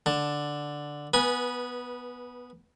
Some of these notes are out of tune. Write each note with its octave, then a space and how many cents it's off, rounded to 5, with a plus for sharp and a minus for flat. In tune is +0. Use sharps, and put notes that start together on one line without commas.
D3 +0 A5 +10
B3 +0 B4 -25 G#5 +0